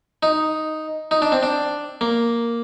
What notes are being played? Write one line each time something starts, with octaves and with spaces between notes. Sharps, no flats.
D#4
D#4
D4
C4
D4
A#3